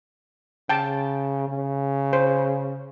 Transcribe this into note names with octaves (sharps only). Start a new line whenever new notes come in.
C#3 G5 A5
C#3
C5